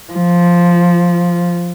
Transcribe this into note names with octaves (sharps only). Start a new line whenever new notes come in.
F3